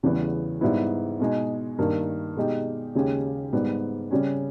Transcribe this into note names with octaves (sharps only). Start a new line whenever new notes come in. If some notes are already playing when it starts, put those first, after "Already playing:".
E2 C#3 E3 G3 B3
G#2 G3 B3 E4
B2 G#3 D#4 G#4
G2 D#3 A#3
B2 G#3 D#4 G4
D#2 C#3 G#3 C#4 G4
G#2 G3 B3
C#3 G3 C#4